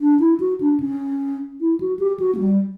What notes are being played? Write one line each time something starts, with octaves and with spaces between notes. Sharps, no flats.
D4
E4
F#4
D4
C#4
E4
F#4
G4
F#4
A#3
G3